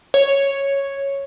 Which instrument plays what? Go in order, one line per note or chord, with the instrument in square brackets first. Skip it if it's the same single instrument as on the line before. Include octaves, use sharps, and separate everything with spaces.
[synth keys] C#5